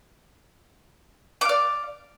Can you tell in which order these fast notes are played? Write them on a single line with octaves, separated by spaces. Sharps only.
D6 F5 D5